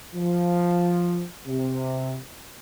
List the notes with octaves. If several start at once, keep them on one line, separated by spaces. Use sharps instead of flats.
F3
C3